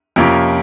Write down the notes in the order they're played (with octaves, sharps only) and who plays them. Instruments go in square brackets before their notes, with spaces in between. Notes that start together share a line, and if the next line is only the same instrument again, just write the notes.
[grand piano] F2 C3 F3 A#3 C#4